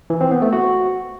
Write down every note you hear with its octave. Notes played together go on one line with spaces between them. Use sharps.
E3
C4
B3
A3
F#4